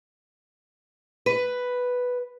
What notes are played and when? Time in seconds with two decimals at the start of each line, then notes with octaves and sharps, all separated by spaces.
1.26 B4